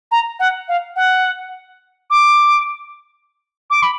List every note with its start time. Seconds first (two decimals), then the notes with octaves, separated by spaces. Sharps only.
0.12 A#5
0.40 F#5
0.68 F5
0.96 F#5
2.10 D6
3.70 D6
3.83 B5